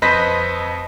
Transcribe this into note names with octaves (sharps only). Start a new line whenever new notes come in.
F2 B4 C5 D#5 A#6 B6